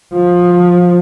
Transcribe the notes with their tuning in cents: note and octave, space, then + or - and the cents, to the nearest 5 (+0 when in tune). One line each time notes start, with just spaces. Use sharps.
F3 +20